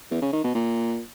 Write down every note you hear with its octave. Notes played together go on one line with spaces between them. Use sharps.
E2
C#3
D#3
B2
A#2